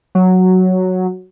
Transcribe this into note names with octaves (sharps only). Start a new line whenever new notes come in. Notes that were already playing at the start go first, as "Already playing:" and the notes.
F#3